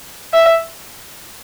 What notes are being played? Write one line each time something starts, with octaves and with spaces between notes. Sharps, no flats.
E5